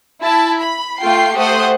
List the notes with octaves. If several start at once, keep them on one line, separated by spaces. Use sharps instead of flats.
E4 A5
B5
A3 F4 G5 C7
A3 G4 C5 F#5 D#6